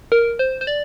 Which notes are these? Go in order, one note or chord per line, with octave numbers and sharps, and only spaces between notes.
A#4
C5
C5
D5